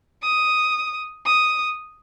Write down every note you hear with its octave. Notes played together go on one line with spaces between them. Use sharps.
D#6
D#6